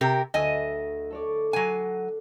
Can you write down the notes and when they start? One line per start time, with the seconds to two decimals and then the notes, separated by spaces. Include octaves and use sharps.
0.01 C3 G4 A#4
0.34 D2 D#5 G#5 E6 E7
1.10 A4 C#5 D5
1.53 F#3 F#5 G#5 C7